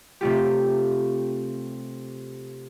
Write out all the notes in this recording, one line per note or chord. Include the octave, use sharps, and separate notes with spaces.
C3 A3 F4 G4